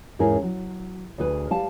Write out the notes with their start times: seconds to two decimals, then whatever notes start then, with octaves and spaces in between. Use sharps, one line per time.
0.19 E2 G#2 C#4 E4 G#4 A#4
0.43 F#3
1.18 D2 G#4 B4
1.51 G3 F5 A5